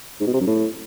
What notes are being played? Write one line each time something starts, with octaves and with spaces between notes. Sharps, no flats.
G#2
B2
C3
F#2
A2